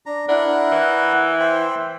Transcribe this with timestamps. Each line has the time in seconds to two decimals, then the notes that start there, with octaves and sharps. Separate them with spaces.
0.06 D4 A#5
0.28 D4 E4 A#4 F#5
0.72 E3
1.40 C5 E5 G5